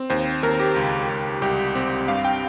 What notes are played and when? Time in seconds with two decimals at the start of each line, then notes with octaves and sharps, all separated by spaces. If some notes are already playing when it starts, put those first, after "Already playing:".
Already playing: C4
0.10 D#2 C5
0.43 D#2 A#4
0.60 G4
0.76 C#2
1.09 C#2
1.42 C2 G4
1.75 C4
2.08 G2 F5
2.25 G5